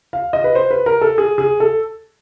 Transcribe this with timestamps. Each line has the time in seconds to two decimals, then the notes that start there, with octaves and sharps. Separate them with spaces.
0.13 F5
0.33 D#5
0.44 B4
0.55 C5
0.71 B4
0.86 A#4
1.01 A4
1.18 G#4
1.38 G#4
1.60 A4